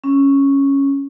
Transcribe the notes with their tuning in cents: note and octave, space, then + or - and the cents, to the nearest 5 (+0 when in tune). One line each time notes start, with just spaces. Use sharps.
C#4 -5